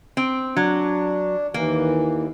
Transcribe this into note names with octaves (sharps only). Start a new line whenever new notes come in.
C4
F#3 D4
D#2 E3 A#3